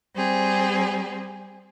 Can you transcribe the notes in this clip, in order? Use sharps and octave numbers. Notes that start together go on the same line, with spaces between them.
G3 C4 G#4